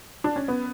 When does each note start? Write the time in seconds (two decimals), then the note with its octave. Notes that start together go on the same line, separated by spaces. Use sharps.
0.24 D4
0.36 C#4
0.48 B3